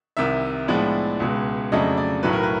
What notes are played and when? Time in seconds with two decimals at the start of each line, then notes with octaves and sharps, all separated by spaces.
0.17 C2 C3 D#3 E5
0.68 A2 F3 G#3 B3 D4
1.20 C#2 B2 G#3
1.72 F2 C#3 F#3 A3 D4 D#5
1.97 D5
2.23 B1 A2 F#3 A3 B4
2.33 A#4
2.43 B4